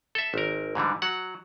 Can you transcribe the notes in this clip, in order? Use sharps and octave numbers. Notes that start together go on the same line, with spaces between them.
A4 E5
G#1 A#4
G#2 D3 E3 G3
F#3 F#5